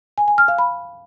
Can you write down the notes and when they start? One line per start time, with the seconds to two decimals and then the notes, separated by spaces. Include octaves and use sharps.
0.18 G#5
0.28 G#5
0.38 F6
0.48 F5
0.59 B5